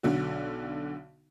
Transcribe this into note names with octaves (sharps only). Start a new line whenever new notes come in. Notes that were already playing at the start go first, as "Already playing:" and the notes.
B1 D3 F#4